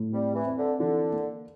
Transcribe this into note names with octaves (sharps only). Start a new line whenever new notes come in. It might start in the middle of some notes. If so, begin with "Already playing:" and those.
Already playing: A2
G3 C4
E3
C4
D3
D3 E3
A#3